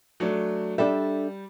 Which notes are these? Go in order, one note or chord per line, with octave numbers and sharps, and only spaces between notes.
F#3 A3 D4
G3 D4 A4 E5